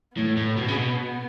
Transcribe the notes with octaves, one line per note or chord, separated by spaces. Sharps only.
A2 B3
A2
B2
C#3
B2